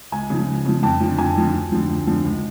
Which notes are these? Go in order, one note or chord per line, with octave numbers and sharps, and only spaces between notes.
C#2 G#5
C#3 F3
C#2
C#3 F3
F2 A5
F3
D3
F2 G#5
D3 F3
D2
D3 F3
D2
D3 F3
C#2